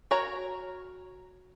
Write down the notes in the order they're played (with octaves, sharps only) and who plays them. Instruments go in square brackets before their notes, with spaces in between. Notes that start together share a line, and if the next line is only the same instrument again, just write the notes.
[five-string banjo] F#4 A#4 C#5 A#5